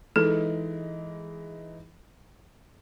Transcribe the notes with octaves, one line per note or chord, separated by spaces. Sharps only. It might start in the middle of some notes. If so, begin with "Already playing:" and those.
E3 G#3 D#4 A4